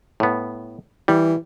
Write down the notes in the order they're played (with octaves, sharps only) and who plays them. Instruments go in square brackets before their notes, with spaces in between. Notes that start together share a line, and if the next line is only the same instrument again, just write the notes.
[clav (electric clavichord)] A2 B3
[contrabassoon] E3 [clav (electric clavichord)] G3